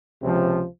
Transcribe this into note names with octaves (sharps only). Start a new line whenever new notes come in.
C#2 C3 F3